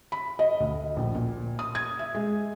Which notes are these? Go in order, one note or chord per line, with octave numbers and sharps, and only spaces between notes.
B5
D#5
D2
A#1
A#2
D#6
G#6
E5
G#3